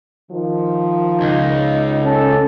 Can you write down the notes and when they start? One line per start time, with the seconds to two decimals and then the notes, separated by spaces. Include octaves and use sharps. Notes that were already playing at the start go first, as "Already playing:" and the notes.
0.30 D#3 F3
1.21 C#2 D#4
2.03 C#4 A4